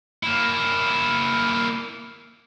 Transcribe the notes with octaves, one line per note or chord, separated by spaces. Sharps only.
A#3 E4